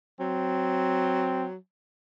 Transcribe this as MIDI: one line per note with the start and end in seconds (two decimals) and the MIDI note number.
0.20 1.56 54
0.20 1.46 60